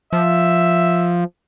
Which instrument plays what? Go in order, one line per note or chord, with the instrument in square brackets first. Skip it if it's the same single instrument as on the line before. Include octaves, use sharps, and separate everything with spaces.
[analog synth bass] F3 [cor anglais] E5